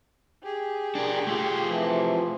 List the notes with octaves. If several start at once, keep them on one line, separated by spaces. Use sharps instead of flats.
G4 G#4
D4 A#4
A3 F4
C3 E3 F3